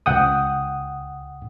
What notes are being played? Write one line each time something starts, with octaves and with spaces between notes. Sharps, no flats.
C#2 F#5 G5 D#6